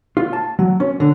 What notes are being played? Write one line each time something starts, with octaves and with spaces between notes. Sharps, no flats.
F4
A5
F#3
C#4
D3